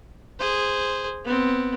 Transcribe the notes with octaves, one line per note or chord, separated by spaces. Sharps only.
G#4 C5
B3 C4